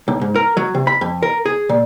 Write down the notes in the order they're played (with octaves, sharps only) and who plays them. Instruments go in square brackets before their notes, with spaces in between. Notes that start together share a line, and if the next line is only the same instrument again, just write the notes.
[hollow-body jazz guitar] B1
G#2
A#4
F#3
C3
B5
F2
A#4
G#4
A#2